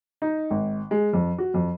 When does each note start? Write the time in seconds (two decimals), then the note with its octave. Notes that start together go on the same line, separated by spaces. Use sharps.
0.22 D#4
0.51 G#1
0.91 G#3
1.13 F2
1.38 F#4
1.54 F2